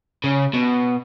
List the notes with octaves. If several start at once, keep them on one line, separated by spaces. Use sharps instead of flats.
C#3
B2